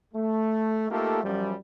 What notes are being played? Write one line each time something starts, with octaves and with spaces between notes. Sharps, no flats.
A3
A3 A#3 D#4 F4 G4 A4
F#2 F3 G3